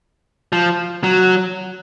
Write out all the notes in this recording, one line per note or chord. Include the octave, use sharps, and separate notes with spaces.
F3
F#3